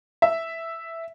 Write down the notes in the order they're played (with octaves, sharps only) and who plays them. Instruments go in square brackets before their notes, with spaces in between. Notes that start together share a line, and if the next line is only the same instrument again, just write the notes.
[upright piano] E5